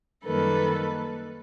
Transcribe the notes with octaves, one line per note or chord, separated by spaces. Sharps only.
F#2 D#3 G3 A#3 A4 B4